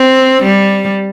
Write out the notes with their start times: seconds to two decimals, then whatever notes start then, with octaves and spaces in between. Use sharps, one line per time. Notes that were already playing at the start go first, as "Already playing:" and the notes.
Already playing: C4
0.43 G3